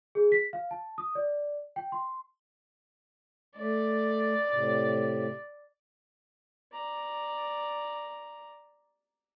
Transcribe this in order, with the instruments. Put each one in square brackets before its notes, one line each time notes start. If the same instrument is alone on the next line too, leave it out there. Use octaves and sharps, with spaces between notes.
[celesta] G#4
B6
F5
A5
D#6
D5
G5
C6
[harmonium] A3 [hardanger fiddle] D5
[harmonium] A2 C3
[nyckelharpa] D5 A#5